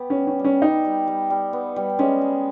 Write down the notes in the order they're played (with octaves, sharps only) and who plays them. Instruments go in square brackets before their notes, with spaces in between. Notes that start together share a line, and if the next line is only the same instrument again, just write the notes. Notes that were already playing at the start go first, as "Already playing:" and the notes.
Already playing: [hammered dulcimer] B3 G4
[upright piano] C#4
[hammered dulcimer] G3
[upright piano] C#4
[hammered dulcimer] G3
[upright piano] C#4
[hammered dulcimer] G3 [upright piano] D#4
[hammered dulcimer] G3
G3
G3
B3
G3
[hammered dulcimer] G#3 [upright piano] C#4
[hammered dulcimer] G#4